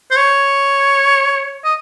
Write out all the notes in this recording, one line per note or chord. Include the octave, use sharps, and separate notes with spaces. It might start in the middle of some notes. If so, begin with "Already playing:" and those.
C5
C#5
D#5